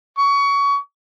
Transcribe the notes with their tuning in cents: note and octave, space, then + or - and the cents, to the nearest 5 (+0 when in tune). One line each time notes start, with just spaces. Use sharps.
C#6 +25